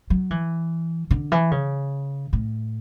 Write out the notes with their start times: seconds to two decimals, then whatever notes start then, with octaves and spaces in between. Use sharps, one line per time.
0.10 F#3
0.31 E3
1.11 D3
1.32 E3
1.51 C#3
2.33 A2